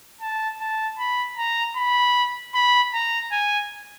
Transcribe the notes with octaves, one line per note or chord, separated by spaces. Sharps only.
A5
A5
B5
A#5
B5
B5
A#5
G#5